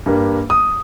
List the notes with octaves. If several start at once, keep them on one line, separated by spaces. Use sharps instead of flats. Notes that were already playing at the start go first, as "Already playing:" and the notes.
G2 G3 A#3
D#6